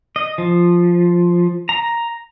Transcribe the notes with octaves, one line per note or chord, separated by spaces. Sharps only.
D#5
F3
A#5